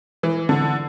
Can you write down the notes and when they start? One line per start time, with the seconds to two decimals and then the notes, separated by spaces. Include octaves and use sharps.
0.23 E3
0.49 D3